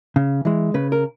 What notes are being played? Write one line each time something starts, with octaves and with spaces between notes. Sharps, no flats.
C#3
E3 G#3
C#3 B4
A#4